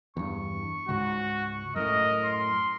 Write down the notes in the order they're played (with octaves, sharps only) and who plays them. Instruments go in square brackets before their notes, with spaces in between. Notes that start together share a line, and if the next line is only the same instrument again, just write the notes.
[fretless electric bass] E2 G2 [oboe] C#6
[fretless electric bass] C#2 G#2 [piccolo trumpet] F#4
[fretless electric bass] F#2 A2 [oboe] A#4 [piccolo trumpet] D#5
[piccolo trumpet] C6